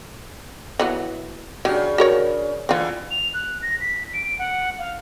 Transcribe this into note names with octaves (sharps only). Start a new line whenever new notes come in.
E3 F#3 B3
C#3 F#3 D4 G4
F#4 A#4 C#5
D3 E3 C4 F4
F7
F#6
A#6
B6
D7
F#5
F5